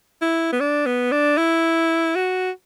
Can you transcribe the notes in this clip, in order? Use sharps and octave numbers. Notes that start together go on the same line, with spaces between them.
E4
B3
D4
B3
D4
E4
F#4